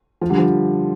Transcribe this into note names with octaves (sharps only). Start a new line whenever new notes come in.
F3
D3 G3
F3